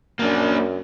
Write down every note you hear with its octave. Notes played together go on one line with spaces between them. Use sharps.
F#2 A#3 D4